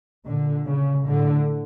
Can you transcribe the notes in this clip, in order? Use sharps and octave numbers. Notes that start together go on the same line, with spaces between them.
A#2 D3
C#3
A2 D3